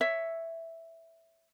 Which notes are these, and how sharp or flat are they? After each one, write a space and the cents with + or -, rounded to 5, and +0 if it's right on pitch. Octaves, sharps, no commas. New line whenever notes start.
C#5 +0 E5 +0